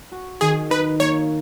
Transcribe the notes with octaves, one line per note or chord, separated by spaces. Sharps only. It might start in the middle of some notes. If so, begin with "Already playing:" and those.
F#4
D#3 G#4
D#4 B4
A#3 C#5